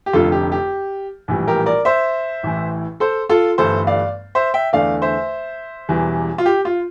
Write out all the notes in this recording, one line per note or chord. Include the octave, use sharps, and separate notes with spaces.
G4
F1 F2 D3 A3 F4 A4
G4
G4
A#1 A2 E3 G3
G4 A#4
A#4 D5
C5 E5
A1 A2 E3
A4 C5
F4 A4
G1 G2 E3 A3 A4 C5
D5 F5
C5 E5
E5 G5
E2 D3 A3 D5 F5
C5 E5
E1 E2 E3 G3
F4
G4
F4